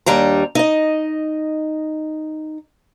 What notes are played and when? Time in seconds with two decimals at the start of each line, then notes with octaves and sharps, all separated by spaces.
0.06 D#2 G3 D4 A#5
0.55 D#4 D#5